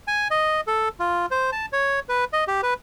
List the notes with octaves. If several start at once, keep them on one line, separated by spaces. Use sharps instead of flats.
G#5
D#5
A4
F4
C5
A5
C#5
B4
D#5
G4
B4